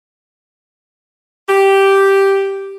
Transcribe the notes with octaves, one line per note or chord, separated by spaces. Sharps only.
G4